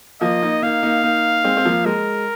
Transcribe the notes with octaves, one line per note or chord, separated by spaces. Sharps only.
F3 A#3 D#5
A#3 D#4
A#3 D#4 F5
A#3 D#4
A#3 D#4
G#3 C4
C4
F3 A#3
G#3 A#4